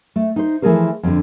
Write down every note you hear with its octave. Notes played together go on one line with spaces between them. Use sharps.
A3
D#4 C5
E3 F3 A3 G#4 A#4 C5
F2 D3